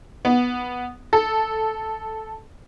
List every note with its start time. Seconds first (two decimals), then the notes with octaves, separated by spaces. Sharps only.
0.25 B3
1.13 A4